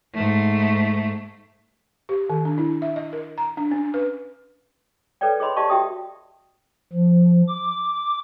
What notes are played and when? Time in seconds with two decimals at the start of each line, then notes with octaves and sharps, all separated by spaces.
0.13 G#2 A3
2.09 G4
2.29 D#3
2.45 D4
2.58 E4
2.82 E5
2.96 D#5
3.13 A#4
3.38 A#5
3.57 D4
3.72 C#4
3.94 B4
5.21 A4 B4 C#5 D5 G5
5.40 G#4 C#5 D#5 B5 C6
5.56 G4 D5 D#5 F5 A5 C#6
5.70 F#4 G4 E5 G5 D#6
6.93 F3
7.48 D6